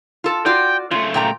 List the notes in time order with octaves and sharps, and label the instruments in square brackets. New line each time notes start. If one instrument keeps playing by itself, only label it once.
[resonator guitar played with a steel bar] F4 A4
[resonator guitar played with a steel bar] F4 F#4 D5 [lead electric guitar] G5
[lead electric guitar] C#3 A3 [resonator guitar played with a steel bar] F4
[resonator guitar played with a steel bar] A#2 G5 A#5